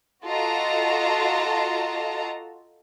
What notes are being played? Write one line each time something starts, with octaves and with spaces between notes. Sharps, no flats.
F4 F#4 A4 D#5 A5 A#5